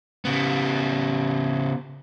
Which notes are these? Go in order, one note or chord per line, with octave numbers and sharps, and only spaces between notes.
C#3 B3